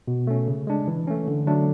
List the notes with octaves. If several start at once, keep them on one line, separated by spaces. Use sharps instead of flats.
B2
A3 C#4
C#3
G#3 D4
E3
A3 C#4
D3
F#3 A3 D4